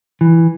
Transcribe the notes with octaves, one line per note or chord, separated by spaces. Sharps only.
E3